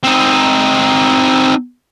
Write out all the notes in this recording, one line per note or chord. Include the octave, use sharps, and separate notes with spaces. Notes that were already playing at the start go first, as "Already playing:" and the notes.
C4 D#4